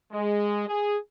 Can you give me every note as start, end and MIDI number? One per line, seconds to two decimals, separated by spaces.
0.12 0.64 56
0.68 0.97 68